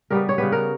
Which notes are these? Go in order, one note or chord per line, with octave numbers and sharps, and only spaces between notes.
C#3 G3 B3 A#4
C#5
C#3 G3 B3 B4
A#4